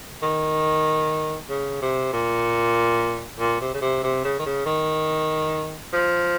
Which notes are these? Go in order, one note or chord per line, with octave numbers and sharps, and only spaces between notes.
D#3
C#3
C3
A#2
A#2
C3
C#3
C3
C3
C#3
D#3
C#3
D#3
F3